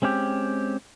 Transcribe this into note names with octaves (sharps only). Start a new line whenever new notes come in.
G#3 C4 C#4 E4 G4